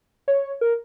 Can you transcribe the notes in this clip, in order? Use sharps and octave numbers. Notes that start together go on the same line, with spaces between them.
C#5
A#4